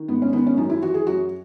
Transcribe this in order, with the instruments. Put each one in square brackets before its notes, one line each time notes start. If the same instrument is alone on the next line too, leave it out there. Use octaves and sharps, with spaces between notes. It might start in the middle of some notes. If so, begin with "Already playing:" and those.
Already playing: [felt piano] D#3
G#2 B3
C#4
D#3 B3
C#4
F#2 D#4
E4
E3 F#4
G#4
F#2 F#4